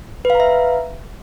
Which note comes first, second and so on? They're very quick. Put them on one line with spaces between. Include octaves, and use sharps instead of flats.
B4 F5 A#5 E5